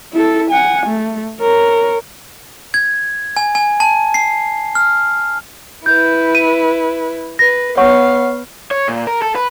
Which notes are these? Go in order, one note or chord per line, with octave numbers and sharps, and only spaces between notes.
E4 A4
F#5 G#5
A3
A#4 C#5
G#6
G#5
G#5
A5
C7
F6
E4 B4 G6
D#7
B4 A#6
B3 C#5 F5 F#5 C#6
C#5
A#2
A#4
A4
B4